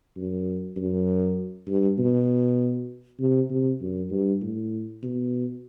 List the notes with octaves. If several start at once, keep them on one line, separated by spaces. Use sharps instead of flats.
F#2
F#2
G2
B2
C3
C3
F#2
G2
A2
B2